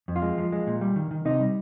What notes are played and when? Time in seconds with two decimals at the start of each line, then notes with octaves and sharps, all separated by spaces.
0.08 F2
0.16 F4
0.22 G#3
0.38 F3
0.52 G#3
0.67 A#2
0.81 G3
0.96 D#3
1.11 D#3
1.25 C3 D#4
1.40 G3